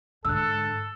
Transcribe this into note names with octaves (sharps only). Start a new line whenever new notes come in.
G#2 D3 A4 E6 F#6